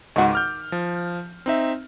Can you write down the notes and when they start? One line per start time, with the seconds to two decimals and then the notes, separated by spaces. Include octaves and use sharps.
0.16 C#2 G#2 D#3 F#4
0.33 D6 F6 G6
0.72 F3
1.46 C4 D#4 E5